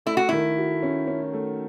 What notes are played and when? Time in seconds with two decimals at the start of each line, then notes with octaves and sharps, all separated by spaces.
0.06 A3 E4
0.17 F#4
0.29 D#3 E4
0.58 F#4
0.83 C#4
1.07 C#4
1.33 A3